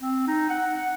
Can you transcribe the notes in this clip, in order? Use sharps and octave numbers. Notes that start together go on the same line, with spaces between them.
C4
D#4
F#5
F#5